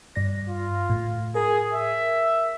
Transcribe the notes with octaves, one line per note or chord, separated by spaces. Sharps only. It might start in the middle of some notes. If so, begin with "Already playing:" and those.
G2 D5 A#6
F4
A2
G#4 A#4
E5